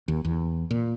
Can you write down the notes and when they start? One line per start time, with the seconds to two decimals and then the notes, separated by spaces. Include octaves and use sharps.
0.08 D#2
0.25 E2
0.71 A#2